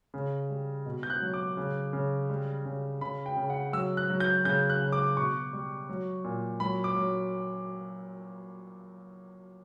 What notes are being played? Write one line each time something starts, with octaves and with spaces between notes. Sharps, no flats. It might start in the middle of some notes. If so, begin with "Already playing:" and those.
C#3
G3
B2
G6
F#6
F#3
D6
C#3
C#3
G3
C#3
C#3 B5
G5
C#3
F#5
F#3 E6
F#6
F#3
G6
C#3 G6
F#6
C#3
D6
B2 C#6
G3
F#3
A#2
F#3 B5
D6
F#3